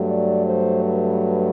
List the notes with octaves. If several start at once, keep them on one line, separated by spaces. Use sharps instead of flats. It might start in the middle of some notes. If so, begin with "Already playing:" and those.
Already playing: G2 F#3 A3
D5
C5
B4